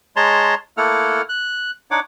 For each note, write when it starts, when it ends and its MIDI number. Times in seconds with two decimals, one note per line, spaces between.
0.16 0.55 56
0.16 0.55 73
0.16 0.55 81
0.16 0.55 82
0.16 0.55 84
0.77 1.22 57
0.77 1.22 58
0.77 1.22 64
0.77 1.22 69
0.77 1.22 78
0.77 1.22 89
1.29 1.71 90
1.91 2.00 62
1.91 2.00 63
1.91 2.00 73
1.91 2.00 78
1.91 2.00 86